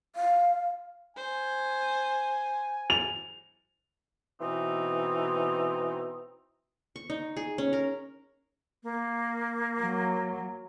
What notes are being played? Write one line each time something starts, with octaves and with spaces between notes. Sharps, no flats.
F5
C5 G#5
F7
B2 E3 C4 D#4
C#6
D#4
G#4
C#4
A#4
A#3
F#3